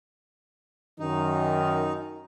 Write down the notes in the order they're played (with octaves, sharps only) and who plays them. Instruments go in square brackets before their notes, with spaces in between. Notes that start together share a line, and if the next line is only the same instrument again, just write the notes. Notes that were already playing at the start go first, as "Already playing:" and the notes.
[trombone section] F#2 D#3 [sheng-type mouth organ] D#4